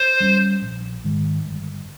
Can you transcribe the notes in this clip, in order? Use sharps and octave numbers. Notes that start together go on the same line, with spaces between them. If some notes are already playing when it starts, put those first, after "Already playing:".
Already playing: C5
G3 C#4
A#1
G#2 D#3 G#3
G1